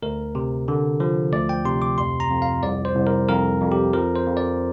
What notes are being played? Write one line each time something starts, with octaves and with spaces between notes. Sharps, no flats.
D2 A#4
C3
D3
F3
D2 D5
G5
C3 C6
D6
F2 C6
A#5
F2
F5
C2 D5
C5
C2
A#4
F2 A#4
F2
G4
F3 A#4
C5
F2
D5